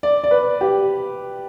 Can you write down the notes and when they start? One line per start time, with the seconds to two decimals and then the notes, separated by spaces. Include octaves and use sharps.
0.03 D5
0.24 D5
0.31 B4
0.61 G4